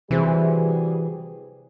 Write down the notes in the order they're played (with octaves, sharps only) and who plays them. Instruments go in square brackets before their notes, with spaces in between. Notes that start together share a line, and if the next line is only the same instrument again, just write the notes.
[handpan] C3 E4 C5 [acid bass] E3 [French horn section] G3 F#4 G#4